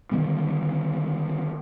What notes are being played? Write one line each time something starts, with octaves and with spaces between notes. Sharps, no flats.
D3 D#3 G3 B3